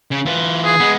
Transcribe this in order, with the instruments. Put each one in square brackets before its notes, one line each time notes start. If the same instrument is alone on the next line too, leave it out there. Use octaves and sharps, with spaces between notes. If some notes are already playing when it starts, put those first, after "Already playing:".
[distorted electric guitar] C#3
E3 F4
[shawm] G#4
[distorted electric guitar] G#3 B3